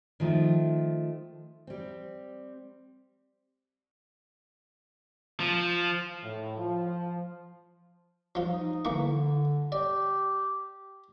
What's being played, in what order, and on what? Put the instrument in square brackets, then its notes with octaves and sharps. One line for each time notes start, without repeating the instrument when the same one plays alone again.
[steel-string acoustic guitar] D#3 F3 A3
G3 C4
[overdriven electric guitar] F3
[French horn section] A2
F3
[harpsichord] F3 F4
[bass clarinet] D#4
[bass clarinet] D3 [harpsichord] E3 A#3 C#6
[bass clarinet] G4 [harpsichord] D5